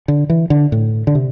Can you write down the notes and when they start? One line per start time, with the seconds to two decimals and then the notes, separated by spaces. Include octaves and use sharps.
0.08 D3
0.30 E3
0.50 D3
0.72 A2
1.07 D3
1.15 C3